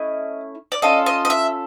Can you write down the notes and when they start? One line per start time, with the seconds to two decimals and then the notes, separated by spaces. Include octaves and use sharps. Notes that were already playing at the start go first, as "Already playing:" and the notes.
Already playing: A3 C#4 E4 D#5
0.72 D5
0.82 C#4 F4 A4 D#5
1.06 D#5
1.25 D#5
1.30 E5